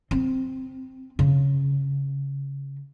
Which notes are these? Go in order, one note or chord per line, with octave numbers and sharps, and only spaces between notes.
C4
C#3